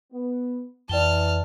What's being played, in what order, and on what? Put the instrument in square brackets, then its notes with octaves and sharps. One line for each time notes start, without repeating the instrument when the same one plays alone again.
[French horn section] B3
[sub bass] F2 [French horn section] E3 [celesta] D5 G5 G7 [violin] A5 F6